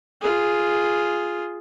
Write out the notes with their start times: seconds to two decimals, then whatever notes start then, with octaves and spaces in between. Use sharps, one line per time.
0.21 F4 G#4